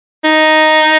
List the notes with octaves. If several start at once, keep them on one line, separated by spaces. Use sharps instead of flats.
D#4